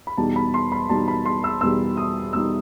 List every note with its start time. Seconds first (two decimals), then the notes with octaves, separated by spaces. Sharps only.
0.07 B5
0.18 E2 B2 G3 D#4 A5
0.36 B5
0.54 C6
0.72 B5
0.89 E2 B2 G3 D#4 A5
1.08 B5
1.25 C6
1.44 E6
1.61 E2 B2 G3 D#4 E6
1.97 D#6
2.33 E2 B2 G3 D#4 E6